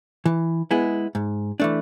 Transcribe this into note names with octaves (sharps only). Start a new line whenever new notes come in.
E3
G#3 B3 E4 G#4
G#2
E3 A3 D4